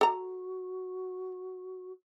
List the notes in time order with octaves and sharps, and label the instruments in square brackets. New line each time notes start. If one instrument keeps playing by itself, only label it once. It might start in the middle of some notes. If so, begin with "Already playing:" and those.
[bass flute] F#4 [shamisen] A4 A#5